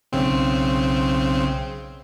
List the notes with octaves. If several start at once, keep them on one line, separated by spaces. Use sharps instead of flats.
B1 C#3 C4